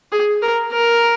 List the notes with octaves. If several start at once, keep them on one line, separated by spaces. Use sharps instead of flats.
G#4
A#4
A#4